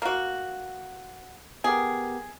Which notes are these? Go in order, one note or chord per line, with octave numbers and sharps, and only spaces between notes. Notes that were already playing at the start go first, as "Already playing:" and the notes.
A#3 F#4
B3 G4 G#4 A#4